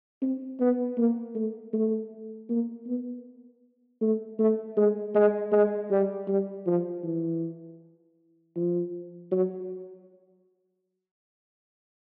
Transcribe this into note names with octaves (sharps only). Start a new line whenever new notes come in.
C4
B3
A#3
A3
A3
A#3
B3
A3
A3
G#3
G#3
G#3
G3
G3
F3
E3
F3
F#3